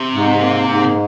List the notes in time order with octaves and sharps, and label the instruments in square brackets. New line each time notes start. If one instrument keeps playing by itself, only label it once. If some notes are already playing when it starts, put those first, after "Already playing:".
Already playing: [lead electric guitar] C3
[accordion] G#2
A#3
G#2